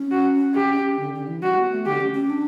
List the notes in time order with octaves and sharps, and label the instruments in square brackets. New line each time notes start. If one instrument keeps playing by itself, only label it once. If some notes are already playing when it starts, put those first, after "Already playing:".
Already playing: [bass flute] C#4
[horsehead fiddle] F#4
G4
[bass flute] D3
D3
E3
[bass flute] G3 [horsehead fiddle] F#4
[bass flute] B3
A3
[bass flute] D3 [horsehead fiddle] G4
[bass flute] C#4
C#4
D4